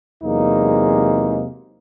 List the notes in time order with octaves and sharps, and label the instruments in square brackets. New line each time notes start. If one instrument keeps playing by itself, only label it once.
[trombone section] E2 C3 F#3 G#3 A#3 D#4